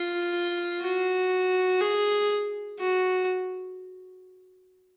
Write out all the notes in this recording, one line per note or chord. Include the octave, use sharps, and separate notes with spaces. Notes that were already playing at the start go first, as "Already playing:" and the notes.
Already playing: F4
F#4
G#4
F#4